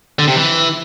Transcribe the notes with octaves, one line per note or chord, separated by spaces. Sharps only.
D3
C3
E3